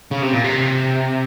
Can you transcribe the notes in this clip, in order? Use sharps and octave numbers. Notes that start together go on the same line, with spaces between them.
C#3
C3
A#2
C3